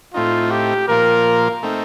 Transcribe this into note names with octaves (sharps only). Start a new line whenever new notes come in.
A2 A3 C4 D#4 F4
G4
A#2 F3 A#3 F4 A#4
A3 C4 D#4